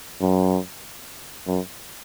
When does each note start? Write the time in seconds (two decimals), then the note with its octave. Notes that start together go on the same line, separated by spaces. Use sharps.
0.21 F#2
1.47 F#2